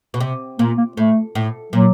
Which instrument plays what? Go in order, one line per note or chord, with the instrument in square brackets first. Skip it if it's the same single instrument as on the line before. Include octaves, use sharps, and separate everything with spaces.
[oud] B2
C3
[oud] A#2 [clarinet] A#3
[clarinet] A#3
[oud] A2 [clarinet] A3
[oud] A2
[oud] A#2 [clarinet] F#3